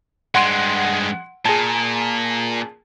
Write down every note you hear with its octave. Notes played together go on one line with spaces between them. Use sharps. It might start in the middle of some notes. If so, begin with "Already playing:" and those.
G2 G#3 F#5 C6 D7
A#2 G#4 A5